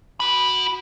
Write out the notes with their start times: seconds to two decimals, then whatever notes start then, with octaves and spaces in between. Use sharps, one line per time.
0.20 F#4 B5